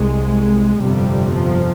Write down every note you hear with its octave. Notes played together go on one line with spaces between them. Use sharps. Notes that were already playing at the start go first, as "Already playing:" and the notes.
Already playing: C2 C3 G#3
G1 F2 C3 G3
F3